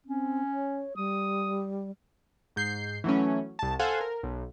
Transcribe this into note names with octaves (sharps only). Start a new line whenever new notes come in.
C4 C#4
C#5
G3 D#6
G#2 G6 C7
E3 F#3 A3 C#4
C2 A5
A4 C5 F5 F#5 G#5
A#4
B1